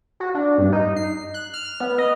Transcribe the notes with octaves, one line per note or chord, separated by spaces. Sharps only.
F#4
D4
G2
D#4
C7
F#6
F6
B3
D#5